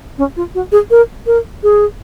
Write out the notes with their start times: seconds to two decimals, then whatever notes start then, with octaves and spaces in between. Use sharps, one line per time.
0.18 C#4
0.37 F4
0.55 F#4
0.72 G#4
0.91 A#4
1.27 A#4
1.63 G#4